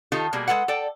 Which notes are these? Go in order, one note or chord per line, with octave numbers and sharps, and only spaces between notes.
D#3 D#4 F4 G4 A4
B2 G3 A#3 G#4
G#3 A3 A4 B4 F#5
A4 D5 G5